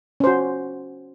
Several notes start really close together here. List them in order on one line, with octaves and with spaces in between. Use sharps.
C#4 C5 F#4